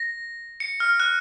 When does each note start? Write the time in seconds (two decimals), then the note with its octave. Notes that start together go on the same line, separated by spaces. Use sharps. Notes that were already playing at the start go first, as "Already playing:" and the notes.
Already playing: A#6
0.60 C#7
0.80 F6
1.00 F#6